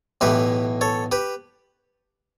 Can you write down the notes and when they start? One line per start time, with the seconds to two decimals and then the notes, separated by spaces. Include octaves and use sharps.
0.21 B1 A2 E3 G4 B4
0.81 A4 C#5
1.12 G4 B4